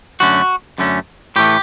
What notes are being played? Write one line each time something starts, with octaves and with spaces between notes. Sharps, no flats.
F#2 D3 A3 C#4 F#4
F#2 D3 A3 C#4
A2 E3 A3 G4